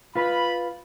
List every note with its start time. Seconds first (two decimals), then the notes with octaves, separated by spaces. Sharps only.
0.16 F4 B4 B5